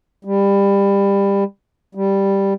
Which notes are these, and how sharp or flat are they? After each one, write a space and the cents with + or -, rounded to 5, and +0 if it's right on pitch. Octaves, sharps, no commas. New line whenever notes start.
G3 +20
G3 +0